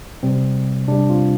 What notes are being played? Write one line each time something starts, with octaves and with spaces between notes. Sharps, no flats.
C3 G3 C4
C3 G3 D4
C4 F4